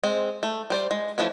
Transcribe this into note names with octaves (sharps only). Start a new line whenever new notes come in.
G#3 C4
A3
G3 C5 D5
G#3
E3 F3 A3 C#4